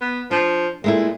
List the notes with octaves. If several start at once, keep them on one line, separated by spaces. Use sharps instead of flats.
B3
F3 D4
A#2 G#3 A3 E4